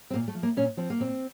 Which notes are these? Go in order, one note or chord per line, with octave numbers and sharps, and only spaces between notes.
C4
A#2 A#3
A3
F3
A#3
A#2 C#4
F3 C4
A#3
A#2 C4